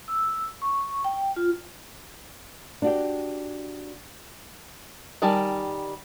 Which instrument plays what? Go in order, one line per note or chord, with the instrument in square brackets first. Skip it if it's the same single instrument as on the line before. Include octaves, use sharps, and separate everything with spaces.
[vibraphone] E6
C#6
G5
F4
[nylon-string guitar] D4 F#4 G4
[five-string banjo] D#3 G3 G#5 A5